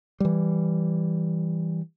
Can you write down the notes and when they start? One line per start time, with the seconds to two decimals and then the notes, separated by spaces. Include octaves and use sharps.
0.20 E3 G3